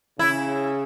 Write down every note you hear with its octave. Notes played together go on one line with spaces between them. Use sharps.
C#3 E4